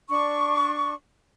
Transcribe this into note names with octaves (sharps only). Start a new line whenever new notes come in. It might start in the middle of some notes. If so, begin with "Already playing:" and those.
D4 C#6